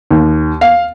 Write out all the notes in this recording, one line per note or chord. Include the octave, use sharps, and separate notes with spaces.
D#2
F5